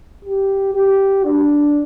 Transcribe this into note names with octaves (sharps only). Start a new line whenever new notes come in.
G4
G4
D4